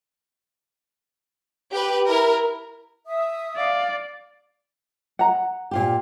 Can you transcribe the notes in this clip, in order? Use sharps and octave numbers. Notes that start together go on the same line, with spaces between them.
G4 B4
E4 A#4
E5 D#6
D5 F5
F#5 A#5
A#2 F4 G4